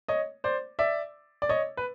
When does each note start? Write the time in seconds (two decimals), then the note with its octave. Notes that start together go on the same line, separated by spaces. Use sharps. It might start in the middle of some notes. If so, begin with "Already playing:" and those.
0.08 C#5 D#5
0.44 C5 D5
0.79 D5 E5
1.42 D5
1.49 C#5 D#5
1.77 B4